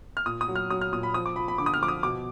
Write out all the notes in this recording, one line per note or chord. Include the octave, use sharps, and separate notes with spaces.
F6
A#2 D#6
D#6
F#3
F6
F#3 D#6
F6
A#2 D#6
B5
F3 D#6
D6
F3 B5
B5
D3 D6
D#6
F6
F3 D6
D#6
B2 D6